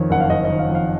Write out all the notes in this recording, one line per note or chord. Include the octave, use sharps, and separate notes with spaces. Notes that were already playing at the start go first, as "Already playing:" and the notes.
Already playing: F2 D#3 C#5
F#1 F#5
F5
F#1 D#5
D#5
D#3
F5
F2
F5